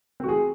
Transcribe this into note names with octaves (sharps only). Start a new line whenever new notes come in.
E3 A3 C4 F#4
G#4